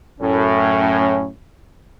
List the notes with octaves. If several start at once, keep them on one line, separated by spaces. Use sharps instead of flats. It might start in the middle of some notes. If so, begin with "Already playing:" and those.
F#2 A2 C#4